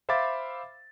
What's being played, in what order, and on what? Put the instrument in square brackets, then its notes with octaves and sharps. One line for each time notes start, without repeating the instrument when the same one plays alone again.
[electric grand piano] C5 E5 F5 B5 D6 A6